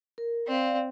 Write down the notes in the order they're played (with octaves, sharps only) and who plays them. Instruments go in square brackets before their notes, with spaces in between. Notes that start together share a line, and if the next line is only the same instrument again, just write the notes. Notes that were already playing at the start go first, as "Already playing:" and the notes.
[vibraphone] A#4
[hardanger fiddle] C4 [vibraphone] D5 F5